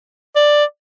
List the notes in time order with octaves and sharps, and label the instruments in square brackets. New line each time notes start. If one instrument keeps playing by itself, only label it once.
[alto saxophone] D5